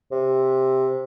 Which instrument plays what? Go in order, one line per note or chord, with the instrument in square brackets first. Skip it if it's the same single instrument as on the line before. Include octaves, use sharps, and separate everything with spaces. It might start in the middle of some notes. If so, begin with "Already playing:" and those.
[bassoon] C3